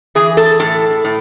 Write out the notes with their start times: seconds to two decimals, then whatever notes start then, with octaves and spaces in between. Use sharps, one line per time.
0.15 E3 G#4
0.37 A4
0.60 A2 A4
1.05 A2